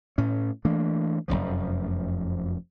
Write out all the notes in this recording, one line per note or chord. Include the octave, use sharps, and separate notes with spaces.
A2 C#4
E3 A3 A#3 D4
F1 A#1 F#2 F3